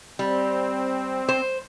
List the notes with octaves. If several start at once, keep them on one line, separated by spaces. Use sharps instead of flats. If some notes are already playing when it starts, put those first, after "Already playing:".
G3 C4
C5